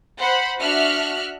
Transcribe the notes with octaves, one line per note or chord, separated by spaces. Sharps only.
C5 F#5 B5
D4 F#4 E5 F6 F#6